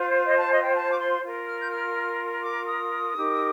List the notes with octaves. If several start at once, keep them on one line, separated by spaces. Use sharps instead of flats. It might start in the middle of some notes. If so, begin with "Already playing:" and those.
Already playing: F4 C5
D#5
A5
D#5
G5
A5
D6
C6
F4 A#4
F6
G6
F6
D6
D#6
D#4 G4 A#4